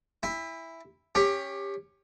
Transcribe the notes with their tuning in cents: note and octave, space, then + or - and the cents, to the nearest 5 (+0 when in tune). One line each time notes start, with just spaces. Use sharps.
E4 +0 G5 +45
C#4 +0 G4 +20